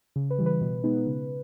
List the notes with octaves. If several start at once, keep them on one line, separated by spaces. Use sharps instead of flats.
C#3
B4
E3 G3
B4
B2
G#3 B3 D#4
C#3